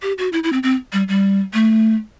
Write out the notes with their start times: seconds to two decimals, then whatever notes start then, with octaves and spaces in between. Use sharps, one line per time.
0.02 G4
0.18 F#4
0.33 E4
0.44 E4
0.53 C4
0.63 C4
0.93 G3
1.08 G3
1.53 A3